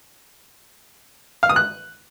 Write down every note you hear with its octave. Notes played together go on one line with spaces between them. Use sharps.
F5
D#6
F#6